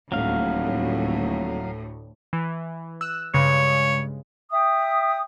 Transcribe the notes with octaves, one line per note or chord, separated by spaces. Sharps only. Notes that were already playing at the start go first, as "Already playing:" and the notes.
D#1 D2 A2 F#3 F5
E3
E6 F#6 E7
G2 C#3 G#3 C#5
E5 G5 D#6